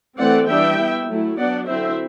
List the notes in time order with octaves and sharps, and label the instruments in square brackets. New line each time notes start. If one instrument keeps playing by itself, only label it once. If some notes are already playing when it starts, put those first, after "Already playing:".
[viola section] E3 A3 C4 D5 F#5
E3 G3 B3 D4 E5 G5
E3 B3 E4
F#3 A3 E4
F#3 B3 D4 D5 F#5
D3 F#3 C4 E4 C5 E5